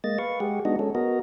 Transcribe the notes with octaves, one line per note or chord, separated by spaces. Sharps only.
G#3 A#3 D#5 A6
B4 F5 C#6
G#3 G4 G#4 F#5
G#3 B3 D4 D#4 F#4 D#5
G#3 C#4 A4
B3 F#4 A#4 D#5